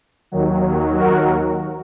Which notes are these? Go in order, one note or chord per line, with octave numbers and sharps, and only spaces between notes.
D#2 D#3 F#3
F#4 A#4